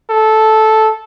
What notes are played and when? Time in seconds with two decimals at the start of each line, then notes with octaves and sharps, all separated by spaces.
0.10 A4